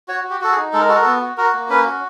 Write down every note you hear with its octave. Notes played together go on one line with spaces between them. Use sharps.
F#4 C#5
F#4
G4
F#4 A4
G#4
D#4
G#3 A4
A#4
F#4 A4
A#4
B3 A4
F#4
F#4 A#4
A#3
C#4 B4
F#4